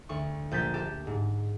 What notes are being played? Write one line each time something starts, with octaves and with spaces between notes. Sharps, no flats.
D2 C#6
A#1 G6 A6 B6
G4 A4
G#2